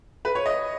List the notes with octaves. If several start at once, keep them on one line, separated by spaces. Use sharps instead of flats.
B4
C#5
D#5